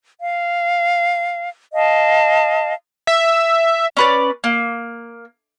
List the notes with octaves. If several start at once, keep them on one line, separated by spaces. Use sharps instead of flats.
F5
D#5 F5 A5
E5
C#4 B4 D5
A#3